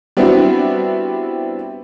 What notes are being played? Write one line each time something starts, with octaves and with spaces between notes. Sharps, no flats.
G3 B3 C4 D4 E4 F#4